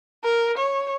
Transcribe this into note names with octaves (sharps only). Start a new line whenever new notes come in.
A#4
C#5